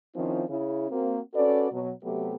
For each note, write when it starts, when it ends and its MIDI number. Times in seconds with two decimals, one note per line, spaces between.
0.16 0.43 51
0.16 0.43 53
0.16 0.43 60
0.16 0.43 61
0.16 0.43 64
0.16 0.43 65
0.49 0.86 49
0.49 0.86 64
0.90 1.20 58
0.90 1.20 60
0.90 1.20 66
1.34 1.68 61
1.34 1.68 66
1.34 1.68 69
1.34 1.68 71
1.34 1.68 74
1.72 1.91 47
1.72 1.91 54
2.04 2.35 48
2.04 2.35 54
2.04 2.35 57
2.04 2.35 59
2.04 2.35 67